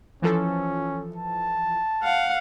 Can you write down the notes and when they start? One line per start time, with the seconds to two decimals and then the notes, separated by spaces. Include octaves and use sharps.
0.22 E3 F3 C#4 A4
1.16 A5
2.03 F5 F#5